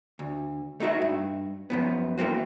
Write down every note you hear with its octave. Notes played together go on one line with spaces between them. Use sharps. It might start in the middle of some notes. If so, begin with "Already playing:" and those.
D2
A3 D#4 F#4 E5
G2
F#2 F3 B3
E3 A3 A#3 C4 F#4